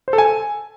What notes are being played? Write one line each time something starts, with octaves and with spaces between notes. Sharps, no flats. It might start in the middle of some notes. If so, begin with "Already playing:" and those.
C5
A4
G#5